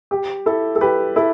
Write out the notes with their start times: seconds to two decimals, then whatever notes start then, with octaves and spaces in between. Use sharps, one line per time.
0.11 G4
0.46 E4 A4
0.76 A4
0.81 G4 B4
1.16 E4 A4